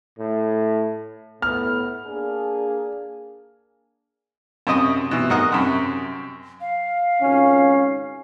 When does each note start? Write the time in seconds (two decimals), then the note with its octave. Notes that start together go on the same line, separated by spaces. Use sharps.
0.19 A2
1.42 A2 B3 F6
2.06 A#3 D4 G#4
4.67 F#2 C3 D#5 D#6
5.11 B2 E3
5.30 G#2 A#4 D#5 F#5 D#6 F#6
5.52 F#2 C3
6.61 F5
7.22 G#1 C#2 C#4